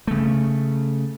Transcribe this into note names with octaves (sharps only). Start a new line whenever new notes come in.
C#3 A3